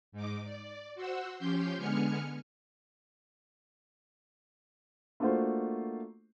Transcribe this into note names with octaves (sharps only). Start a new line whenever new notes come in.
G#2 D#4 D6
D5
F#4 C5 F#5 E6
F3 C#4 G4 G5 C6 G6
D3 G#3 B3 G#5 F6 C#7
A3 A#3 D4 F4 F#4 C5